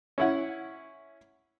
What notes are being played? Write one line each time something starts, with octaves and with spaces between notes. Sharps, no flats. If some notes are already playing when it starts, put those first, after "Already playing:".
C#4 E4 F#5